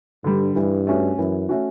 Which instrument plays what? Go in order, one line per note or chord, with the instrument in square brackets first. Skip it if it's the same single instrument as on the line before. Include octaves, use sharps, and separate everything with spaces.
[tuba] G2 [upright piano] D3 G3
[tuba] G2 [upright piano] E3
[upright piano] A3 C#4 F#4
[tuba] F#2 [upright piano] E3
[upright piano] A3 C#4 F#4